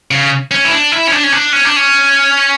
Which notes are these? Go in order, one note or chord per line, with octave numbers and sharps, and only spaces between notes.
C#3
C#4
E4
D4
E4
C#4
D4
C#4
D4
C#4
D4
C#4